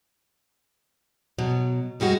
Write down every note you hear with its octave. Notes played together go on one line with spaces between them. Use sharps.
B2 F#3
F2 G3 G#3 F#4